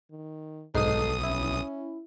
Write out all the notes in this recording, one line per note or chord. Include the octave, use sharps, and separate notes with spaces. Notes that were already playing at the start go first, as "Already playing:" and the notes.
D#3
B1 G#2 D#4 A4 D#6 C7
C#4 E4